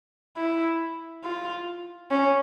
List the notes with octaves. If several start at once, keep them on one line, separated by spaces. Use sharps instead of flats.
E4
F4
C#4